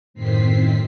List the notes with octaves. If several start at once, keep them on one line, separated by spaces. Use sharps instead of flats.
F#2 A2 D#3 C4 B6 C7